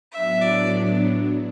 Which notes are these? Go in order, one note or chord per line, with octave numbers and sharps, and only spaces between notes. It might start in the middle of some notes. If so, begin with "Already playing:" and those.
A2 F#3 B3 D4 E5
D5